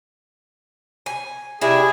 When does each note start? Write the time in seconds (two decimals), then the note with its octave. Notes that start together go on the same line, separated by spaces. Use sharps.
1.06 G#5
1.61 C3 D4 E4 G#4